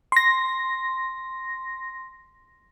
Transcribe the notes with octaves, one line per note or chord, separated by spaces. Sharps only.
C6 A#6